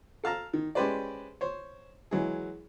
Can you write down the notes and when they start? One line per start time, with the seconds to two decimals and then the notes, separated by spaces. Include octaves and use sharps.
0.24 A4 F5 A5 A#5
0.54 D#3
0.75 G#3 C#4 G4 B4 C5 D5
1.41 C5 C#5
2.11 E3 F#3 G#3 G#4